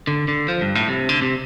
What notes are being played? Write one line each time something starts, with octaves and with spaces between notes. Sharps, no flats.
D3
D3
F3
G2
A2
C3
D3
C3